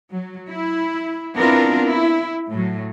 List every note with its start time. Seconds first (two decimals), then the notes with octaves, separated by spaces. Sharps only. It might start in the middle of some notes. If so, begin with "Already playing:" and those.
0.13 F#3
0.51 E4
1.36 B3 C4 D4 E4 F4 A#4
1.82 E4
2.51 A2 F#3